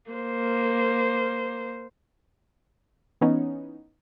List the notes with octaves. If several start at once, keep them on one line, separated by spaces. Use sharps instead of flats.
A#3 C5
E3 B3 C#4 D#4